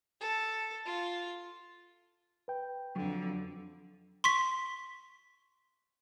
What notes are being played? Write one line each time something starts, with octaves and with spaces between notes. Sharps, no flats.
A4
F4
B4 G5
F2 D3 F#3
C6 C#6 B6